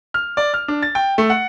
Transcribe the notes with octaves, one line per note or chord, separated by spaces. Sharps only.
F6
D5
F6
D4
A6
G5
A3
F#5